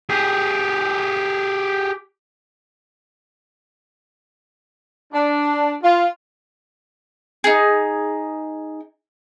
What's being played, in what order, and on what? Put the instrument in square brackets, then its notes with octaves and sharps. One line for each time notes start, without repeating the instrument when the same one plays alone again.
[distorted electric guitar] G4 G#4
[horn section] D4
F4
[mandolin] D#4 G#4